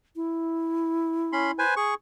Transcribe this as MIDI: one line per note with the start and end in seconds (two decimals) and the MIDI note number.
0.16 1.63 64
1.33 1.51 61
1.33 1.51 83
1.33 1.51 84
1.59 1.74 71
1.59 1.74 72
1.59 1.74 80
1.77 1.94 68
1.77 1.94 85